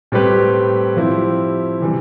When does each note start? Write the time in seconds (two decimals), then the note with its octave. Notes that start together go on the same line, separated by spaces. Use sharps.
0.12 A2 G3 C4 G4 B4
0.97 F3 C4 E4 G4
1.80 C3 E3 G3